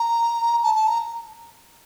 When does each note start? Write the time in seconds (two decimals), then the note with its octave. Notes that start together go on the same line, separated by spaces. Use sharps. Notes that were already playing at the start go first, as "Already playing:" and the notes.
Already playing: A#5
0.63 A5
0.75 A5
0.87 A#5